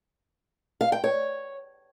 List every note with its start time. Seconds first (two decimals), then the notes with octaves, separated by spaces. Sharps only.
0.81 F5
0.92 G5
1.04 C#5